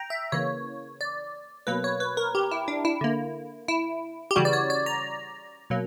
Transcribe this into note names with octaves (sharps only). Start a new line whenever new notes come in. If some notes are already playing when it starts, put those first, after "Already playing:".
Already playing: G5 A#5
E5
C#3 E3 A#3 C#5
D5
B2 F#3 A#3 B4
C#5
B4
A#4
G4
E4
D4
E4
D3 A#3
E4
G4
C#3 E3 G3 F#4
D5
C#5
D5
A#5
B2 F#3 A#3